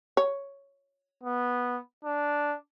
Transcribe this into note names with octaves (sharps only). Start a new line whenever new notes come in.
C#5
B3
D4